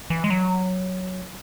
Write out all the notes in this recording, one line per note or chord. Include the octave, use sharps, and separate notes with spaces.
E3
G#3
F#3